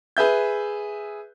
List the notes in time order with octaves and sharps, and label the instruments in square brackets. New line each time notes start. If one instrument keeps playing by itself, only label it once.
[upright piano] G#4 B4 E5 G6